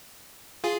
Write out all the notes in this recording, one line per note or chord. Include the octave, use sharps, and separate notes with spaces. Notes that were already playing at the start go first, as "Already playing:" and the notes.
F4 G#4